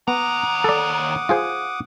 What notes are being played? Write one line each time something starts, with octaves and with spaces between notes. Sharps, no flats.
D#2 B3 F#5 A#5 D6 D#6
A4 D5
F4 G#4 C5